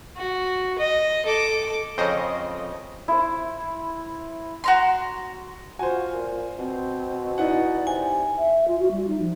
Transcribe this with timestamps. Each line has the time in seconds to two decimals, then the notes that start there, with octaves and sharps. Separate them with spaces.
0.17 F#4
0.79 D#5
1.26 A4 D6
1.98 F2 C#3 C5 C#5 D#5
3.08 E4 C5
4.64 F#4 A#5 C6
5.79 F4 F#4 C5 G#5
6.13 A#2
6.58 B2 C4
7.38 D#4 E4 D5 F#5
7.87 C3 G#5
8.36 E5
8.68 F4
8.80 F#4
8.91 G3
9.07 D#4
9.20 F3